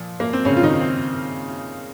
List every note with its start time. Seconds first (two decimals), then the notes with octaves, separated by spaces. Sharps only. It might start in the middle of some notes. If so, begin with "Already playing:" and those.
Already playing: A#2 F3
0.20 A#3
0.33 C4
0.45 C#3 C#4
0.57 F4
0.63 D#3 D#4
0.80 C4